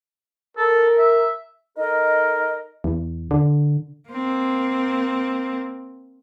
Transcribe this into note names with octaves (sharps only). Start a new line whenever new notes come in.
A4 A#4
E5
D#4 A4 A#4 D#5
E2
D3
A#3 C4